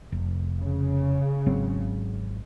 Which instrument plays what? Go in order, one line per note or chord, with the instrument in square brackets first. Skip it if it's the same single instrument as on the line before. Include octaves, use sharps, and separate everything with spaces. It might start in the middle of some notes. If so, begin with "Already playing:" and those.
[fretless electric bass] F1
[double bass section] C#3
[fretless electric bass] G#1 F#3 C4